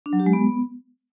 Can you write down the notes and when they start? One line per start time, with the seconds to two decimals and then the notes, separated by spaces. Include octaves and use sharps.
0.06 D4
0.13 F#3
0.20 G4
0.26 G#3
0.33 B3